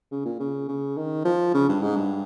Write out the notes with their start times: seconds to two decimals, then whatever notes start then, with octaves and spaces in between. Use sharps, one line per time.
0.12 C#3
0.25 A#2
0.39 C#3
0.68 C#3
0.97 D#3
1.25 F3
1.54 C#3
1.69 G2
1.82 G#2
1.96 G2